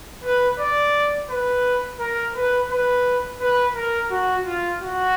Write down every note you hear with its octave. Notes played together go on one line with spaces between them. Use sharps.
B4
D5
B4
A#4
B4
B4
B4
A#4
F#4
F4
F#4